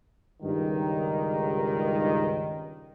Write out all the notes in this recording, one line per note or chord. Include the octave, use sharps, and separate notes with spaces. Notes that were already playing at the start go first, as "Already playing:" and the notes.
C#2 G2 D#3